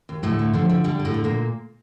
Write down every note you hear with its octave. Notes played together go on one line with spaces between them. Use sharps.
D#2
D2 A2 A3
D3
D3 F3
D3
D3 G3
D3
A2 A3
D3
A#2 A#3